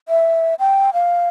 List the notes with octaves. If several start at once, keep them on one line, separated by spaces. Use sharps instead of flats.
E5
G5
F5